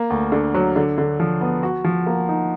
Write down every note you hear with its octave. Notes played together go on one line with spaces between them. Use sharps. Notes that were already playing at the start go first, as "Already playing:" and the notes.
Already playing: A#3
D2
D3
F#3
D3
D3
F3
B3
F#4
F3
A#3
D#4